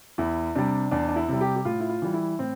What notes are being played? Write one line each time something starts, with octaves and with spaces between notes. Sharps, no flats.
E2 E4
C3 G3 D4
E2 D4
D4
E4
C3 G3
G4
G4
A2 F4
E4
F4
E3 G3
E4
A2 C4